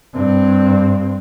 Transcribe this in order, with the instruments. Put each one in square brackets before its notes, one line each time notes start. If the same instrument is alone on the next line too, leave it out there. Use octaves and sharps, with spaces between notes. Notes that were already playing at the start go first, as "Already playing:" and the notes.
[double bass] G2 C4